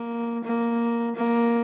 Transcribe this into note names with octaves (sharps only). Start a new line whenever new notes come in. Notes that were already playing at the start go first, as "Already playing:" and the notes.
Already playing: A#3
A#3
A#3